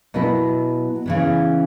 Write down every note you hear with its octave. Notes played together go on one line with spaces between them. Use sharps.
B2 F#3 B3 E4 B4
C#3 E3 B3